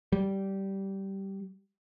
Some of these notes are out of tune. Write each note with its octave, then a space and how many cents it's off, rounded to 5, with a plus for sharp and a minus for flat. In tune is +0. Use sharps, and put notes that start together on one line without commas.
G3 -15